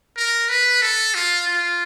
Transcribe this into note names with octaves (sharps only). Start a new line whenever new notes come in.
A#4
B4
A4
F4
F4